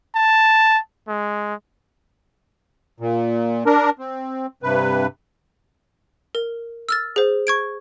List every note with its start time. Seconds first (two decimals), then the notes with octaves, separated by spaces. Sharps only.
0.15 A5
1.08 G#3
3.00 A#2
3.66 D4 A#4
3.99 C4
4.63 G2 C3 B4
6.35 A#4
6.89 E6 F6 A6
7.16 G#4 C5
7.47 C#6 G#6 D7